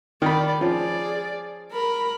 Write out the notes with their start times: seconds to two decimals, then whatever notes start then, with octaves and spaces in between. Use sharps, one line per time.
0.22 D#3 D5 B5
0.61 F3 C#4 G#4 D5
1.72 A#4 B5